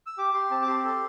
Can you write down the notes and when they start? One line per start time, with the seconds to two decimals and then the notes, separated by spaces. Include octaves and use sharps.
0.06 E6
0.18 G4 D6
0.34 G4 C6
0.51 C4 A5
0.62 D6
0.68 G4 C6
0.84 A4